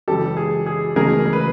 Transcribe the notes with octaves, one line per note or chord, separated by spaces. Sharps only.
F#2 C#3 E3 G#3 G4 A4
G#4
G#4
C#2 C#3 E3 A3 G#4 A#4
A#4
B4